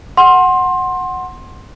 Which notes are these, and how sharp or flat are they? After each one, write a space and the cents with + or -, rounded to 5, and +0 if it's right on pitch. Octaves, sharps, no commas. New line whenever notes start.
F#5 +0 C6 +20